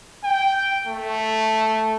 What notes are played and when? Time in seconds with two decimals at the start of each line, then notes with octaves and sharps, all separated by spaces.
0.24 G5
0.87 A3